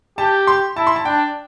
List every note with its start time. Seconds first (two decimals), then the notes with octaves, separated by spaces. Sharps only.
0.18 G4 A5
0.47 C6
0.77 E4 A5
0.87 C6
0.96 A5
1.05 D4 G5